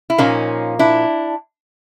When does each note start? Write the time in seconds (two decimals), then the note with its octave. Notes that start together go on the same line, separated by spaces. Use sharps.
0.10 E4
0.18 A#2 F3 A#3 C#4 D#4
0.79 D4 E4